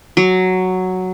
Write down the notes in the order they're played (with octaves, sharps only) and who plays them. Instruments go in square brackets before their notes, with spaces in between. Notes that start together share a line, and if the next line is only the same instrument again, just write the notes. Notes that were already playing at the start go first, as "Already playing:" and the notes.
[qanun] F#3